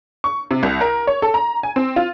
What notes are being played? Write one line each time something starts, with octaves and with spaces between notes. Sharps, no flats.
C#6
C3
C2
A#4
C#5
A4
A#5
G#5
C4
F4